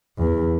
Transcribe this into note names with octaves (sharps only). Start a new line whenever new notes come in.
E2